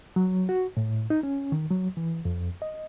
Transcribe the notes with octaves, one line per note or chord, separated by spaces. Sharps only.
F#3
F#4
A2
D#4
C#4
D#3
F#3
E3
F2
D#5